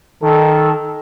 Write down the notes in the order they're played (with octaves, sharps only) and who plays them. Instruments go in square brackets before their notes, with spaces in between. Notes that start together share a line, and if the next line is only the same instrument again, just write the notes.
[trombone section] D#3 A4